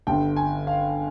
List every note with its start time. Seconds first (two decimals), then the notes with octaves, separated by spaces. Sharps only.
0.07 G1 G2 D3 G5
0.36 G#5
0.67 F5